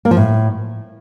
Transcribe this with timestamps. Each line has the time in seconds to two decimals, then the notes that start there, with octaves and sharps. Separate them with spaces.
0.05 A#3
0.11 F3
0.17 A2